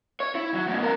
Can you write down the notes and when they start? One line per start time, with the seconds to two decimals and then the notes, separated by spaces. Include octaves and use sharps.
0.20 C#5
0.35 E4
0.54 F#3
0.68 E2 A2
0.82 B3 A#4